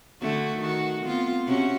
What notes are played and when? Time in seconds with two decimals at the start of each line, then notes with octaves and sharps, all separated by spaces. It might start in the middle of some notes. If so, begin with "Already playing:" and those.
0.21 D3 A3 F#4
0.58 D#3 F#4
1.05 B3 C4 F4
1.46 C3 C#4 F#4